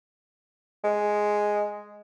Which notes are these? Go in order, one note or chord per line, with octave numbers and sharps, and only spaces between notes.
G#3